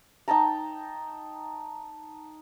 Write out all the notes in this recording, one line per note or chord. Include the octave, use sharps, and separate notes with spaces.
D#4 G5 A5 A#5